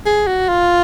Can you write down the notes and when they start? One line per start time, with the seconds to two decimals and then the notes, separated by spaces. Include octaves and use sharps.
0.06 G#4
0.27 F#4
0.49 F4